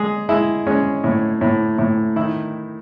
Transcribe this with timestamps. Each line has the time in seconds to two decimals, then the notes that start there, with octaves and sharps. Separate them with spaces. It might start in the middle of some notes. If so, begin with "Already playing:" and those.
Already playing: G#3 G#4
0.29 G#3 E4
0.67 G#3 C#4
1.04 A2
1.41 A2
1.78 A2
2.16 D#3 E4